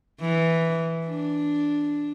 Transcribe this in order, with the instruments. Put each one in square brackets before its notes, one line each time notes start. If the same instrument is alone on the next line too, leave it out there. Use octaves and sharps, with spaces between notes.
[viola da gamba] E3
D4